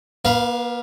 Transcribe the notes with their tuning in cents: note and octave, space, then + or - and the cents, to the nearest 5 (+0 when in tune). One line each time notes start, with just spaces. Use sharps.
A#3 +40 B4 +0 F5 +0